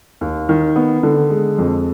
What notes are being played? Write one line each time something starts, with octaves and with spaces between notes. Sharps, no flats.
D#2
D#3
B3
D3
G#3
F2